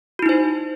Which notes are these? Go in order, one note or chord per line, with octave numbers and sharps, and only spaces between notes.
D#4 E4 F#4 C5